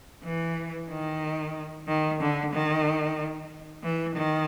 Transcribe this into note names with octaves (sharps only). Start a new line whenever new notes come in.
E3
D#3
D#3
D3
D#3
E3
D#3